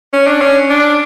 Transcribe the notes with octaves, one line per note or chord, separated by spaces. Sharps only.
C#4
D4
C#4
D4